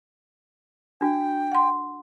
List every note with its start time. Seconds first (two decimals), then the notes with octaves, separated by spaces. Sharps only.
1.01 D4 F#4 G5
1.52 F#5 C6